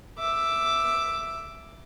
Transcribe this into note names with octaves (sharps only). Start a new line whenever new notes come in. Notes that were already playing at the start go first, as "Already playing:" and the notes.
E5 D6